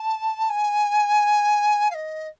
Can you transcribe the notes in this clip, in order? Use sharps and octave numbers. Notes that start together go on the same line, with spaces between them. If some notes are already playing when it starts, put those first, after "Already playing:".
Already playing: A5
G#5
F5
D#5